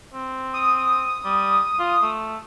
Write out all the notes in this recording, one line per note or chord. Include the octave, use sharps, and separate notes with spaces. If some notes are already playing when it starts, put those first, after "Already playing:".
C4
D#6
G3
F4
A3